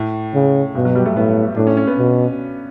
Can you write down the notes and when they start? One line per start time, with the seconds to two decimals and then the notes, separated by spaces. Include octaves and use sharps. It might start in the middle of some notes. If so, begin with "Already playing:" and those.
Already playing: A2
0.34 C#3
0.75 G2 B2
0.85 F#3
0.95 G3
1.06 A3
1.16 A2 B3
1.56 A2 D4
1.67 C#4
1.77 C#4
1.87 B3
1.98 B2